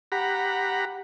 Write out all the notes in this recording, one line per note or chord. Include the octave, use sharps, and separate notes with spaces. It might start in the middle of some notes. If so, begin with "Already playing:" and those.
G4 F#5 A#5 B5